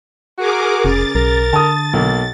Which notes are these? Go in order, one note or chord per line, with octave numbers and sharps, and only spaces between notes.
F#4 G#4 A#4 D6
F1 C#3 A6
B1 A#4
D3 A5 D#6
B1 A#3